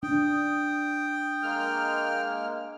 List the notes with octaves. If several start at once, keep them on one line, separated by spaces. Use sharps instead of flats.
D4 G5 D#6
G#3 A#3 F6